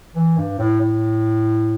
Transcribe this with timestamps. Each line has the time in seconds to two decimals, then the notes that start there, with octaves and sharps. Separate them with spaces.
0.16 E3
0.37 G2
0.59 A2
0.80 A2